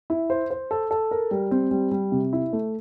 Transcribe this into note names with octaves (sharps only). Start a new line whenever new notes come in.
E4
C5
C5
A4
A4
A#4
G3
C4
G3
G3
C3
E4
A3